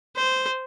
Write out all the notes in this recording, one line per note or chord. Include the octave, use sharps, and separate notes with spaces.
C5